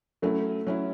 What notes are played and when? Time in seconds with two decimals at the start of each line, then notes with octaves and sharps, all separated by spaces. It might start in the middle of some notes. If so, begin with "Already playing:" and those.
0.22 F#3 A3 C#4 E4
0.67 F#3 C#4 E4